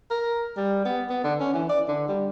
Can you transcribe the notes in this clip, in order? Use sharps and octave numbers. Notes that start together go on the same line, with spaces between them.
A#4
G3
B3
B3
D3
C#4
E3
D5
D3
G3